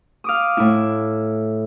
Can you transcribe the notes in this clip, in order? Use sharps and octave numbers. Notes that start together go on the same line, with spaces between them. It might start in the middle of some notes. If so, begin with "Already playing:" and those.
F5 D6 D#6
A2 E4